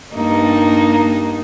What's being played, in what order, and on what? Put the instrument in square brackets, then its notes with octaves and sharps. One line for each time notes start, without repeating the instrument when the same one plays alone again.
[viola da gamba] G2 A#3 D#4